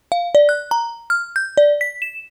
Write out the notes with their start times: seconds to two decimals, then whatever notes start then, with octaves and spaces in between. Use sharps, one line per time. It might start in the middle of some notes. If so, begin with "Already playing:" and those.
0.12 F5
0.35 D5
0.49 F#6
0.71 A#5
1.10 F6
1.36 G6
1.57 D5
1.81 B6
2.02 E7